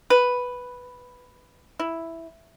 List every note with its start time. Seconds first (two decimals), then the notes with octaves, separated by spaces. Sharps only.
0.10 B4
1.79 E4